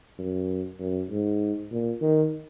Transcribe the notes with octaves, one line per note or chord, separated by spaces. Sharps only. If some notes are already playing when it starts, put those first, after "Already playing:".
F#2
F#2
G#2
A#2
D#3